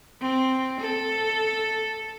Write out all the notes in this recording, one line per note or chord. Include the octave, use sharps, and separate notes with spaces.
C4
A4